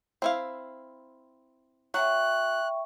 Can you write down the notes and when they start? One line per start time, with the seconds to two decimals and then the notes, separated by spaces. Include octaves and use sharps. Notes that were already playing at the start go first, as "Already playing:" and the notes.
0.22 C4 E4 F5
1.94 F#3 E5 G5 C#6 F#6